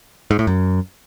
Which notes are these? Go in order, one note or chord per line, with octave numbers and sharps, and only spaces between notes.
G#2
A2
F#2